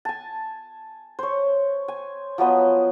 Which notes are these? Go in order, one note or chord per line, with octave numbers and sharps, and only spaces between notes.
G#5 A5
C5 C#5
G#5
F3 F#3 B3 D#5